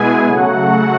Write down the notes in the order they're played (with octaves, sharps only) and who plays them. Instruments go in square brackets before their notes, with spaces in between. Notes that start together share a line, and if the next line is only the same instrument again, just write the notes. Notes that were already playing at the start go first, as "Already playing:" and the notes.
Already playing: [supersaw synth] B2 G#3 B3 E4 G#4 G#5
C#3 F#3 A3 F#4 F#5